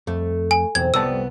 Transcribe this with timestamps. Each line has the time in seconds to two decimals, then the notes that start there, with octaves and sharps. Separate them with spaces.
0.07 F2 A3
0.51 G#5
0.75 B1 E2 C4 G#6
0.94 C2 F2 G3 B3 D5 A5 E6